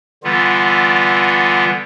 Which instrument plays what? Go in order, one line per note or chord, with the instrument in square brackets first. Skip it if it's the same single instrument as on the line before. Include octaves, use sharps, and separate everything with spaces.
[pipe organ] D3 E3 G3 B3 F4